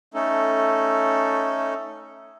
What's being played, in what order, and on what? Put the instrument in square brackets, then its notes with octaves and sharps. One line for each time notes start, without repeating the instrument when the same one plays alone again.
[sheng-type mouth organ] A3 C#4 D#4 A4